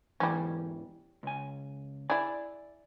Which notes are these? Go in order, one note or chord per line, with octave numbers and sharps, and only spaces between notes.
E2 G#2 E3 G3 C#4
C#2 G#5
E4 G#4 D5